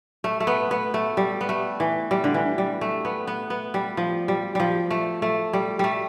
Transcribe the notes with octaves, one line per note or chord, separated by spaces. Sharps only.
A3
A3
B3
B3
A3
G3
B3
A3
E3
G3
D3
E3
G3
A3
B3
B3
B3
G3
F3
G3
F3 G3
A3
A3
G3
G3 A3